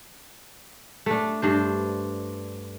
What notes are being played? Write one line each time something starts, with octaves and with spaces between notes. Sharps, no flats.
A3 D4
G2 D4 C5